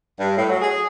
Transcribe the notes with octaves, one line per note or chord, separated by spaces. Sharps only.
G2
A2
F#3
G#4